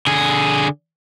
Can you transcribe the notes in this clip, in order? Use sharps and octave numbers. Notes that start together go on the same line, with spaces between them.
D3 G#4